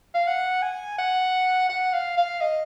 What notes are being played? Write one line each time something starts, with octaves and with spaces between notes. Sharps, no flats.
F5
F#5
G#5
F#5
F#5
F5
F5
D#5